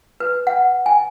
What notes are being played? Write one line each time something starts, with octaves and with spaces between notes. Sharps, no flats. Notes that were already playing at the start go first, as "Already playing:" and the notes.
B4
F#5
G#5